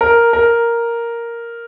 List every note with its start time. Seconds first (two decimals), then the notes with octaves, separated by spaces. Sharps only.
0.01 A#4
0.33 A#4